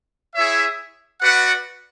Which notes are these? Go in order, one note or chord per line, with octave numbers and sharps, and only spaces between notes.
E4 G#4 C#5 E5
F#4 B4 D5 F#5